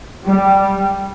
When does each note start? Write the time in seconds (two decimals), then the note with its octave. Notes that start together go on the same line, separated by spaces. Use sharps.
0.24 G3